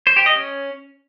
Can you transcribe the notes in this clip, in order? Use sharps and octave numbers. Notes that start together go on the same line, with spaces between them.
C5
G4
D#5
C#4